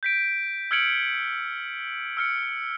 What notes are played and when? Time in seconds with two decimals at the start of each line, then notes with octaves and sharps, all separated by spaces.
0.03 G6 B6 D7
0.71 E6 F6 G#6 C#7 D7 F#7
2.17 E6 F6 C#7